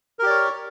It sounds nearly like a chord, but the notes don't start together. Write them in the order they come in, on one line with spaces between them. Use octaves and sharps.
A#4 G4 D5 C#5